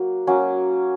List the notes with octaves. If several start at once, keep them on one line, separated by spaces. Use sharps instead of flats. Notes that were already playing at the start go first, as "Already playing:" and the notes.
Already playing: F#3 A#3
F#3 A#3 C#4